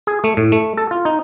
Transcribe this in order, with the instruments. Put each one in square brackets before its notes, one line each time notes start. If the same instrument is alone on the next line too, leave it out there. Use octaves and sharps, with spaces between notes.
[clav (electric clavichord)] G#4
A3
A2
A3
A4
F4
D#4